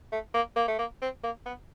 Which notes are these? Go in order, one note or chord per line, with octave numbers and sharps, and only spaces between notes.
A3
A#3
A#3
A3
A#3
C4
A#3
B3